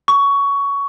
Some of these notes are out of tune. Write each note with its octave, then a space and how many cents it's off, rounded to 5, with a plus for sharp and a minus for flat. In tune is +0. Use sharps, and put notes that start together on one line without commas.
C#6 +15